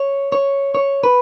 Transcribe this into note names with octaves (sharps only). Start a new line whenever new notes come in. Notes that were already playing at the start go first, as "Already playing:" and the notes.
Already playing: C#5
C#5
C#5
B4